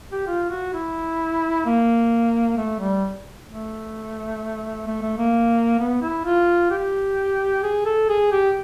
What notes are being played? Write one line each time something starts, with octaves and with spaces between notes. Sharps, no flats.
G4
F4
F#4
E4
A#3
A3
G3
A3
A3
A3
A#3
B3
E4
F4
G4
G#4
A4
G#4
G4